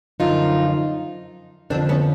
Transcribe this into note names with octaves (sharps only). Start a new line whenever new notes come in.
F#2 D3 F3 D#4 F4
F2 D3 F3 C4 D4
B3 C#4